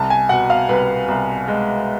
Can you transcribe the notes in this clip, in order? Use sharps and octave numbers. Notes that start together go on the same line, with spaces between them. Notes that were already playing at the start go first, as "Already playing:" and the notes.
Already playing: C2 A5
G#5
B2 F#5
F5
C2 B4
C2
G#3